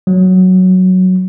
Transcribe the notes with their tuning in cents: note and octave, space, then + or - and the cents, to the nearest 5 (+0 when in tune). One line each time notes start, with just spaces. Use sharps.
F#3 +0